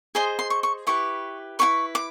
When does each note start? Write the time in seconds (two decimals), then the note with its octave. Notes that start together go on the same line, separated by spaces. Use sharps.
0.15 G#4 C5 D#5 C6
0.39 C6
0.50 C#6
0.63 C#6
0.87 E4 G4 B4 C#6
1.59 E4 G#4 B4 C#6
1.95 D6